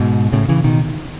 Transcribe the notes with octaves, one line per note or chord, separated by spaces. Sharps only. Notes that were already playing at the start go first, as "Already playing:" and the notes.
Already playing: G#2 B2
A2 C#3
C#3 E3
B2 D#3